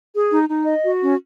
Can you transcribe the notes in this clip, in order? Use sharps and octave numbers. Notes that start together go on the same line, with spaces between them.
G#4
D#4
D#4
D#5
F#4
C#4